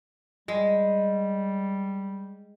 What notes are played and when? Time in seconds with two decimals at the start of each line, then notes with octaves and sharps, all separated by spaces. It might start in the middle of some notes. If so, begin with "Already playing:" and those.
0.48 G3 G#3